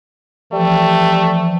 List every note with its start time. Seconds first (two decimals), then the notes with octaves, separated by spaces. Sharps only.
0.53 E3 F3 G3 A3